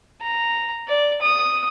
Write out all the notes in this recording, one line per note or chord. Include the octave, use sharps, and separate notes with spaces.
A#5
D5
D#6